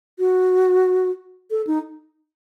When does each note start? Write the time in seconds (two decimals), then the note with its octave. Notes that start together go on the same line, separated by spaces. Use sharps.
0.19 F#4
1.50 A4
1.67 D#4